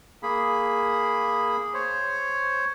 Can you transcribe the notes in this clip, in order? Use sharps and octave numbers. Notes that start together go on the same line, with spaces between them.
A#3 G#4 B5
C5 C#5